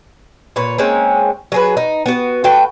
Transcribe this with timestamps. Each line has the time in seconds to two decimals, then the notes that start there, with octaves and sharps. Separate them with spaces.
0.56 A#2 B4 C#5
0.78 G#3 A#3 C4 C#4
1.52 F#3 G#4 B4
1.77 D#4
2.06 B3 F#4
2.44 A3 F#4 B4 G5